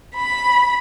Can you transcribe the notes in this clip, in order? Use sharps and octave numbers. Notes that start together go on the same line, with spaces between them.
B5